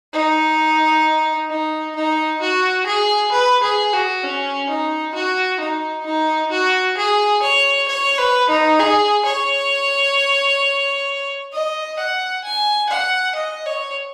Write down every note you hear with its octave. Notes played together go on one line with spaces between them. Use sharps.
D#4
D#4
D#4
F#4
G#4
B4
G#4
F#4
C#4
D#4
F#4
D#4
D#4
F#4
G#4
C#5
C#5
B4
D#4
G#4
C#5
D#5
F#5
G#5
F#5
D#5
C#5